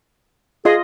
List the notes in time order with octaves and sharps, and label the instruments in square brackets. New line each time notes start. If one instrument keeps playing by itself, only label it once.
[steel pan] F4 D#5 C6 [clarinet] G#4